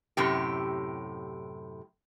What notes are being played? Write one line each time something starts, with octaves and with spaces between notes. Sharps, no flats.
F#2 A2 C3 G4